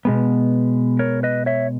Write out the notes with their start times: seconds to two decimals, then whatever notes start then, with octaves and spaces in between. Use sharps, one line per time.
0.05 B2 G#3 B3
0.99 A#4 C#5
1.23 B4 D#5
1.46 C#5 E5